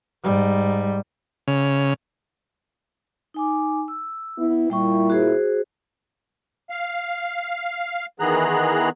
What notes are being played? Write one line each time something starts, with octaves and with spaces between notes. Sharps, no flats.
G#2 G3
C#3
D#4 G#5 D6
E6
B3 E4
A#2 G3 E4 G5 C#6
F#4 G#4 C5
F5
D#3 E3 B3 G#4 A#5 F#6